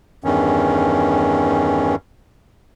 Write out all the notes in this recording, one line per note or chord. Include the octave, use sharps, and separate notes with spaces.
E2 G2 D#3 C#4